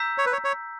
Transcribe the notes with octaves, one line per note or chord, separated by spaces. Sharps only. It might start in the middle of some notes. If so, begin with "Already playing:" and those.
Already playing: A#5 E6 G6 B6
C#5
B4
C#5
C#5